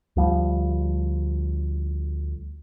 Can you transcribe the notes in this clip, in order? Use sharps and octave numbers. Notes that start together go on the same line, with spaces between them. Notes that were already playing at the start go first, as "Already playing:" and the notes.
D2 F3 G3